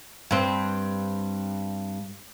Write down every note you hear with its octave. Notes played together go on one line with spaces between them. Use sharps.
G2 C4